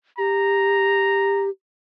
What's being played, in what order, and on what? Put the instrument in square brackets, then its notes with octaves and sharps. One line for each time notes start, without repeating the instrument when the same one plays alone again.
[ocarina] G4 [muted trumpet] A#5